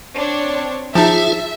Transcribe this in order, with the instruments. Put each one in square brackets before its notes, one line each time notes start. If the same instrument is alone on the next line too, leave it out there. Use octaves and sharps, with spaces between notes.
[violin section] C4 D4 C#5
[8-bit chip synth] F3 D#4 [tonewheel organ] F4 G#4 [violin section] E5 [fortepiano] A5